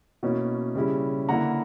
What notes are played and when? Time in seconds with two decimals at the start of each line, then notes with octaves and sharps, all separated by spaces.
0.23 B2 A#3 C#4 E4
0.75 C#3 G3 C#4 E4
1.29 D3 A#3 E4 F#5 A#5